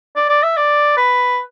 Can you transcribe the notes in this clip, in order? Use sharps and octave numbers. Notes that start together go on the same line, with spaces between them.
D5
D5
E5
D5
B4